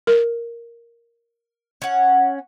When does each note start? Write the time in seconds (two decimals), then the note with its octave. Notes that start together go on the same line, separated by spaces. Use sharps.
0.07 A#4
1.82 C#4 F#5